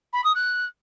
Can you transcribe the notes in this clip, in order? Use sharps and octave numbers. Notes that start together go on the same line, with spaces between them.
B5
D#6
F#6